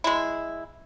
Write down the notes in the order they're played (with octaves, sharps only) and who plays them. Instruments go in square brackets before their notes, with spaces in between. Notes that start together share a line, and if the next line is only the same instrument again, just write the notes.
[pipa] G#3 E4